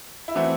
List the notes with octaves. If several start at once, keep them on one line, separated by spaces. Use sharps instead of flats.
E4
E3 A3 C4 F#4